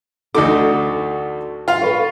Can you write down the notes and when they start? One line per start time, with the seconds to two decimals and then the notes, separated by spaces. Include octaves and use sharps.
0.35 D2 D#4 F#4 A4 D6
1.68 F4 F5
1.82 A4 B4 C#5